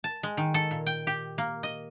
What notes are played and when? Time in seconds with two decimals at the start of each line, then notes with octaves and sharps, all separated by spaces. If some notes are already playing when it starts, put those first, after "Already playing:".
0.04 A5
0.23 G#3
0.37 D#3
0.54 A4
0.71 A#2
0.87 G5
1.07 G4
1.38 A#3
1.63 D#5